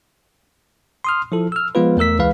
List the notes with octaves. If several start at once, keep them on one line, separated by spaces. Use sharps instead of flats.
C6 D#6 F6
F3 E4 A4
E6 F6
F3 G#3 B3 F4 B4
E2 A3 A#4 E6 B6
C#2 E3 G#3 B4 F5